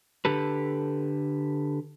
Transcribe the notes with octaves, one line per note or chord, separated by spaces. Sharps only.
D3 G4 A4 B4